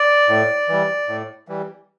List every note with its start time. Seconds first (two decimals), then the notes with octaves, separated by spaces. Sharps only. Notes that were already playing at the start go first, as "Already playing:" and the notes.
Already playing: D5
0.29 A2
0.68 E3 G3
1.09 A2
1.48 E3 G3